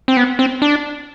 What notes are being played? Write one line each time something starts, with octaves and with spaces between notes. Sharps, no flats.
C4
B3
C4
D4